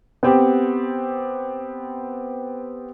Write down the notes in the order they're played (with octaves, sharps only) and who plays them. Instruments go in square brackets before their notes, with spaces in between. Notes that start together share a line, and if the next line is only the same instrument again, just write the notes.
[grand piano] B3 C4 G4